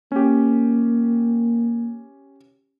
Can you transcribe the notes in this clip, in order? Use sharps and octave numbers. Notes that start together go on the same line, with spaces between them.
A#3 C#4 G4